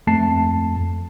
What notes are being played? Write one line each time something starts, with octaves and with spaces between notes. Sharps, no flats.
F2 A3 A5 C7